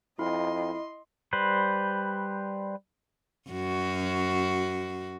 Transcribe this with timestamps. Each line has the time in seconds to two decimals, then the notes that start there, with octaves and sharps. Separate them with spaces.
0.19 F2 E4 D#5 C6
1.33 G3 B4 C5
3.49 F#2 F#4